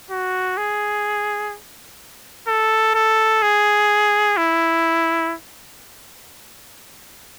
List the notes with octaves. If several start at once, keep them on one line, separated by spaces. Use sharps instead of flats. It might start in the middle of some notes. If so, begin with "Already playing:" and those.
F#4
G#4
A4
A4
G#4
E4